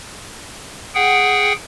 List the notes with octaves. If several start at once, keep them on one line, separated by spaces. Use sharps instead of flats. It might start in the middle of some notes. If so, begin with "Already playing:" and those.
G#4 F#5 G5